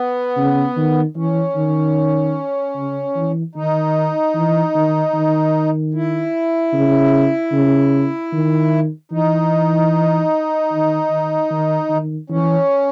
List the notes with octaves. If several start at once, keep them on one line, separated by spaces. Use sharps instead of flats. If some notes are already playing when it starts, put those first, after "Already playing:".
Already playing: B3
C#3
D#3
E3 C#4
D#3
C#3
E3
D#3 D#4
E3
D#3
D#3
E4
C#3
C#3
D#3
E3 D#4
D#3
D#3
D#3
D#3
E3 C#4